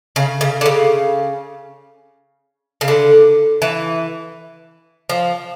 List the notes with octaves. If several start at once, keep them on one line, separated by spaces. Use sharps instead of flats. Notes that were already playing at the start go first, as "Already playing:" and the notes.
C#3
C#3
D3
C#3
C#3
D3
E3
F3